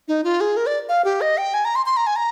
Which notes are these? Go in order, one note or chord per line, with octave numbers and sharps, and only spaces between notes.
D#4
F4
G#4
A#4
D5
F5
G4
D#5
G5
G#5
A#5
C6
C6
A#5
G#5
A#5